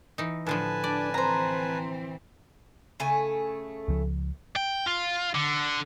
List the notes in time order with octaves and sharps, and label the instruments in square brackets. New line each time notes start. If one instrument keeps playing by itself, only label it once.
[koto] E3 D#4
[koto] A2 D3 F3 [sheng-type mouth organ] B4 G#5 A5
[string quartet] D4 [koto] D5
[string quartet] E3 C4 [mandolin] C5 A#5
[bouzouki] C#3 A3 G#5
[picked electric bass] C#2 F3
[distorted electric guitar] G5
F4
D3